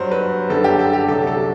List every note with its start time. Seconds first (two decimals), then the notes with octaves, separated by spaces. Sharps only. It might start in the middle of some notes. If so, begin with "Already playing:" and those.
Already playing: G2 F#3 C5
0.11 B4
0.50 F#2 D3 G3 A4
0.64 G4
0.79 A4
0.93 G4
1.08 C2 C3 F#3 A4
1.27 A4